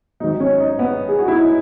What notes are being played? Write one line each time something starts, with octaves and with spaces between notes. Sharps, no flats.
G#1 G#2 D#3 F#3 D#4
C#4
D#4
B3
G#4
F#4
E4
D#4